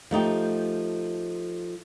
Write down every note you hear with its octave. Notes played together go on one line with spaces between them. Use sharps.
F3 A3 D#4 G4